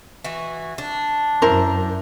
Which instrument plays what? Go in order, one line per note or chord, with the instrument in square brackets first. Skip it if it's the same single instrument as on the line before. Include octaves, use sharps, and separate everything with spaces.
[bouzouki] E3 F#4
D4
[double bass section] F#2 [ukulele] E4 A#4 C5